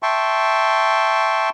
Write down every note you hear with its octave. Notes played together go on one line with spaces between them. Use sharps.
E5 G5 A5 C6 C#6